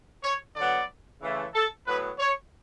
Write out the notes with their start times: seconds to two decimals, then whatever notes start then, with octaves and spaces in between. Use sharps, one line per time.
0.23 C#5
0.56 D3 F#3 B3 D5
1.22 C#3 E3 A3
1.54 A4
1.86 A2 F#3 B3 B4
2.19 C#5